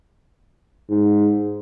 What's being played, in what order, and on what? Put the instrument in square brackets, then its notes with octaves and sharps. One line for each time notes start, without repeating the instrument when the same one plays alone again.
[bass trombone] G#2